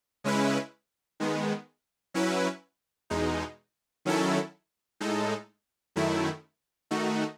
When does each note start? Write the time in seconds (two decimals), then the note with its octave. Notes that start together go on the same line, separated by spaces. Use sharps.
0.24 C#3 G#3 C#4 E4 B4
1.20 D#3 G#3 B3
2.14 F#3 C#4 E4 B4
3.10 E2 B2 G#3 D#4
4.05 D#3 F#3 C#4 E4 A4
5.00 A2 G#3 D#4 A4
5.96 F#2 D#3 A3 E4
6.91 D#3 A3 D#4 F#4